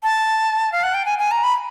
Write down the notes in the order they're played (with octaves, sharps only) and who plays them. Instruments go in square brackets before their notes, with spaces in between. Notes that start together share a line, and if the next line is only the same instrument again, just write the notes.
[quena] A5
F5
F#5
G5
G#5
G#5
A#5
B5